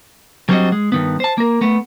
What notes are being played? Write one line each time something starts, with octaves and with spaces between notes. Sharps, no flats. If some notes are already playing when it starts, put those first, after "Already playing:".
F#3 G3 C4 D4 F#4 D#5
G#3
G2 D#3 B3
C5 A5
A#3 A#4
A3 B3